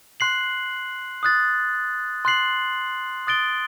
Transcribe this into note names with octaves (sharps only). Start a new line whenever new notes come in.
C6 F#6 C7 F#7
D#6 F#6 A6
C6 F#6 C7 F#7
D#6 F#6 A6 D7 G7